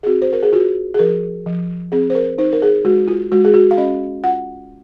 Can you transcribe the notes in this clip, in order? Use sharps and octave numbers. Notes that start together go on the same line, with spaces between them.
G#4
C4 F#4
C5
A#4
G#4
F4 F#4
G#4
F3 A#4
F3
C4 G#4
C5
A#4
D#4 C5
A#4
G#4
G#3 F#4
F4
G#3 F#4
G#4
F#4
F5
C#4 D#5
F4 F#5